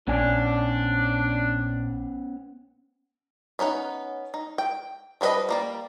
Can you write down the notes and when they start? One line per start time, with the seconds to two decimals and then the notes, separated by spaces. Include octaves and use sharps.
0.08 A#1 B3 C#4 D4 G#5
3.59 B3 C#4 D#4 F#5
4.34 D#4
4.58 G5
5.21 F3 G3 B3 B4 D#5
5.49 G3 A#3 D5